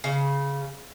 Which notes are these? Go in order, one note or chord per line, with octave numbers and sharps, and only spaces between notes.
C#3